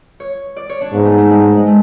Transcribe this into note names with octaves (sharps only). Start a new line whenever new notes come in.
C#5
D5
C#5
D4
G#2 B3
A3
A3
G#3
G#3
A3